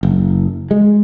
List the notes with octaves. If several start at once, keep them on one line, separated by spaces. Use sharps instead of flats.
F#1
G#3